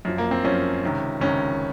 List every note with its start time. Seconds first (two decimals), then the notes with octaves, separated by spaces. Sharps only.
0.05 F#2 F3
0.18 A#3
0.31 C4
0.44 F#2 F3 C#4
0.83 C#2 C3 D#3
1.21 C#2 C3 D#3 C#4